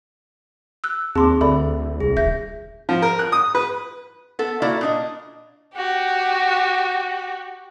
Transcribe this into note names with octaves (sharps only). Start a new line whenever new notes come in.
E6 F#6
D#2 C4 G#4 A5 C6 D6
D2 A4 D5 E5 B5
C2 G#4
D#1 E5 G6 A#6
F3
A#4
F#6
D#6
B4
B3 A4
A#3 E4 F#4 D5
A#2 D4 D#5
F#4 G4